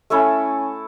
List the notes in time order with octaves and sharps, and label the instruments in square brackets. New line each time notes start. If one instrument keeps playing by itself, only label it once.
[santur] A3 C#4 E4 A4